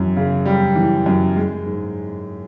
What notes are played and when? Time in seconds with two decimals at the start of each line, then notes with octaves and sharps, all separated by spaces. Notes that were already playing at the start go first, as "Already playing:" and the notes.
Already playing: F#2 E3
0.16 C#3
0.46 G3
0.75 E3
1.06 F#2
1.36 G#3
1.66 G#2